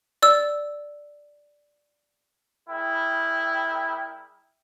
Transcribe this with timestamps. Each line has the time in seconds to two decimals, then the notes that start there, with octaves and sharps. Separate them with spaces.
0.22 D5 E6
2.69 G3 E4 G#4 A#4 G5